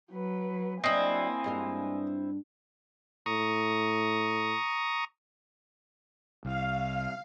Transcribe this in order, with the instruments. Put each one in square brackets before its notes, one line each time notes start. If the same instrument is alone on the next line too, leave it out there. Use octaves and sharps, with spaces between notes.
[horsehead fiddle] F#3 B4
[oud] F#3 D4 [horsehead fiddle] A#3 G#5 [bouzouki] C4 E4 [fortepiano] D#5
[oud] G2 G#3 F4
[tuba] A2 [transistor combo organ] A#5 C#6 D#6
[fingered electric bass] C2 [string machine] F5